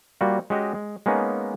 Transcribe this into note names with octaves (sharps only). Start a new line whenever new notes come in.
G3 A#3 F4 F#4
G#3 C#4 F#4 G4 D#5
G#3
G#3 A#3 B3 C#4 D#4